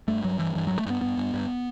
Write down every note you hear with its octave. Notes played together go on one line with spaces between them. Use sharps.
G2 A3
G2 F#3
G2 E3
G2 E3
F#3
G2
A3
G2 B3
G2 B3
G2
G2